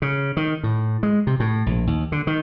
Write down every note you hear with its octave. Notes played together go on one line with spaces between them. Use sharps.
C#3
D#3
A2
G#3
C3
A2
A#1
D#2
D3
D#3